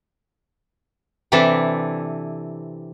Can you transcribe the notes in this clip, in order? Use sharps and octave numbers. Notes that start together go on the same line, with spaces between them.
C3 E3 C4 D4 E4 A4